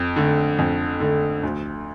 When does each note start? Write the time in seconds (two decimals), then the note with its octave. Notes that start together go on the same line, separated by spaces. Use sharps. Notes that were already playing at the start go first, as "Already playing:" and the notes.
Already playing: F2
0.16 D3 A3
0.58 F2
1.00 D3 A3
1.43 D2